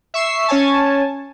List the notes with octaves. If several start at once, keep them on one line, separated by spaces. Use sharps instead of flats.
E5 C#6 E6 C7
C#4 C#5 G#5 A5